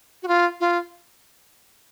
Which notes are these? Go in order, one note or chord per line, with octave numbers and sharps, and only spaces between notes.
F#4
F4
F4